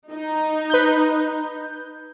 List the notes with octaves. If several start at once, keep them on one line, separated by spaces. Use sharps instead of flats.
D#4
B4 G6